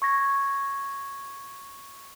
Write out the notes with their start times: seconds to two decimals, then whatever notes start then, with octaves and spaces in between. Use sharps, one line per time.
0.02 C#6 G#6 A#6